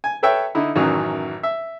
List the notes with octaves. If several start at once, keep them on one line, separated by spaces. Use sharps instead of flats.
G#5
A4 B4 C#5 E5 G5
D3 D#4 E4
A1 F#2 D#3 E3 F#3
E5